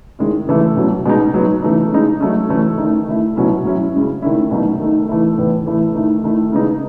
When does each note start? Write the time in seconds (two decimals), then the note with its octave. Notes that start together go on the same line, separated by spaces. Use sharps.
0.19 D#3 G#3 C#4 E4
0.48 C#3 E3 A3
0.77 B2 F#3 C#4
1.06 B2 G#3 D#4
1.34 F#3 B3 D#4
1.62 C#3 E3 A3 D#4
1.92 C#3 G#3 D#4
2.20 F#3 A3 C#4
2.49 E3 A3 C#4 E4
2.78 D#3 A3 D#4
3.07 D#3 A3 E4
3.36 B2 F#3 C#4 E4
3.65 F#3 C#4 E4
3.93 C#3 G#3 C#4
4.22 D#3 A3 C#4 E4
4.51 B2 F#3 A3 D#4
4.80 D#3 A3 D#4
5.09 E3 A3 E4
5.38 A2 E3 B3
5.67 E3 A3 E4
5.95 D#3 A3 D#4
6.24 D#3 A3 E4
6.52 C#3 G#3 B3 D#4